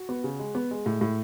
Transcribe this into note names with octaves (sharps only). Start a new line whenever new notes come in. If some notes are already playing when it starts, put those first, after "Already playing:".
Already playing: F#4
B3
C#3
G#3
B3
G#3
A2
A2